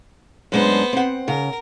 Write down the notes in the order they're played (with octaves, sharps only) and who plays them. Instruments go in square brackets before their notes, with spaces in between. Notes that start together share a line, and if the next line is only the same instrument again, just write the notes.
[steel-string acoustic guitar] F#2 G#3 D4 [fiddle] B3 C5
[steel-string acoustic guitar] C4 F#5
[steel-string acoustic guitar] C#3 [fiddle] A#4